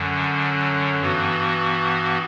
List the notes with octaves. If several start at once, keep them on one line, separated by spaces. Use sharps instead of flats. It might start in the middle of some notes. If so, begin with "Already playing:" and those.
Already playing: F#2 D3 F#3
G2 E3 B3 F#4